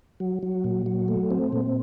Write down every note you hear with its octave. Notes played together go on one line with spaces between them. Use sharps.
F#3
F#3
A#2
F#3
A3
C4
A#2